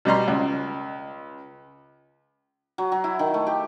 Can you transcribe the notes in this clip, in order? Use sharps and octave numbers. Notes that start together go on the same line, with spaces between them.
B2 G3 A#5 C6
C#2
F#3
F#3
E4
D#3
A3
G4